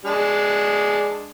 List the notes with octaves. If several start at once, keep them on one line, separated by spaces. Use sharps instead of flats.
G#3 D4